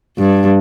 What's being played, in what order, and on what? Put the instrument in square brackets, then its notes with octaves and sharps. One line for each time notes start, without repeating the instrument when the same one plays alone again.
[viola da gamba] G2